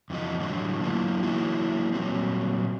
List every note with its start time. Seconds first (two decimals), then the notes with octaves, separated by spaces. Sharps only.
0.10 F2 E3 F#4 D#5
0.40 A2 D3 E3 F#3 G3 A3
0.80 D3 F#3 A#3 B3 E4 F4
1.23 E3 F#3 A#3 D#4 E4 F#4
1.92 A#2 F#3 G3 C4